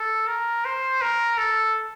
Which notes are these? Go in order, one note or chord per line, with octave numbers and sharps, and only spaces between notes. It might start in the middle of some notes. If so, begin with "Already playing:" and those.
Already playing: A4
A#4
C5
A#4
A4